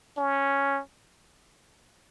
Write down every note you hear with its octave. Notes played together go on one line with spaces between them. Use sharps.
C#4